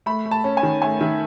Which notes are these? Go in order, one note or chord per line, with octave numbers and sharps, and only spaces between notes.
A3 B5
A3
A5
C#4
G#5
D#3
A3 G#5
D#3 E5